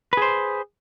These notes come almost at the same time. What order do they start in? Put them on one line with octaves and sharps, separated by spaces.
B4 G#4 C5